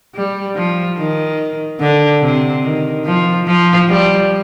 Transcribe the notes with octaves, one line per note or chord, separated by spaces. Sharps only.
G3
F3
D#3
D3
C3
D#3
F3
F3
G3